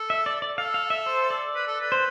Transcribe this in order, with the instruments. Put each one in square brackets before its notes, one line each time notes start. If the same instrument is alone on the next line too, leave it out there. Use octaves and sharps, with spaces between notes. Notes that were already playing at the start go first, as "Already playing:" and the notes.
Already playing: [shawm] A4
[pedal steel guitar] E5
D5
D5
[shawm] A4 [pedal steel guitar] F5
[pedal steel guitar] F5
E5
C5
D5
[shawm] B4
A4
B4
[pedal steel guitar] C5